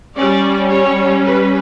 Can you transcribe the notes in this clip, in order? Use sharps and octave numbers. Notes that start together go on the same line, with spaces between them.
G3 C#4 D5
C#5
B4